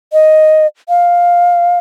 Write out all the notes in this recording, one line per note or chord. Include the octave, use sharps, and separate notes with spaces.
D#5
F5